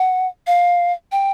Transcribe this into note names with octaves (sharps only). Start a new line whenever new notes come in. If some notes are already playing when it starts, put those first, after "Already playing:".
Already playing: F#5
F5
G5